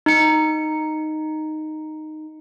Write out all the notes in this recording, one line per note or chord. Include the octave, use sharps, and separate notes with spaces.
D#4 C#7